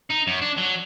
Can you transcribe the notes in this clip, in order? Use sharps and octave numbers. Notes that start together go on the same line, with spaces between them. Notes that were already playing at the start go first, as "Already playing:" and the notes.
D#4
F#2
D4
F#3